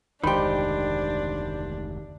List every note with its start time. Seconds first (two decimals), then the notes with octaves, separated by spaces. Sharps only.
0.23 F1 D2 D#3 G#3 D4 G4 C5 B5